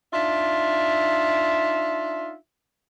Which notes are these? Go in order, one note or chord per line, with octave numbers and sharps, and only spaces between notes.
D4 D#4 F4 E5